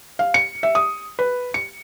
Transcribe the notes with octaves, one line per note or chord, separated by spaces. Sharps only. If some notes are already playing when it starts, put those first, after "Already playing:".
F5
C#7
E5
D#6
B4
C#7